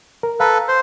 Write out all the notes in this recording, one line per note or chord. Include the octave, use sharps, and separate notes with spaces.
A#4
A4 B4 F5 A#5
C5